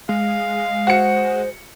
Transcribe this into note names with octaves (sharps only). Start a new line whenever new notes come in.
G#3 F5
F#4 C5 C#7